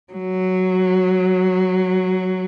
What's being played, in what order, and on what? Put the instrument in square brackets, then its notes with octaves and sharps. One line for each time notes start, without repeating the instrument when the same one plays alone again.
[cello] F#3